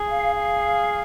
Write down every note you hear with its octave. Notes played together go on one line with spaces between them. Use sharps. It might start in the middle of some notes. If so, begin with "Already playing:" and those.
Already playing: G#4
F5
F5